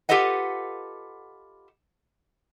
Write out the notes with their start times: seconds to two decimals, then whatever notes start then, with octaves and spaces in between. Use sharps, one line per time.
0.09 F4 G4 A4 B4 D#5 F#5